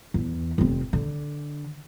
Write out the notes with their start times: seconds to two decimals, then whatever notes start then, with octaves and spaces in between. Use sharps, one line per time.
0.14 E2
0.58 F1 C4
0.93 D3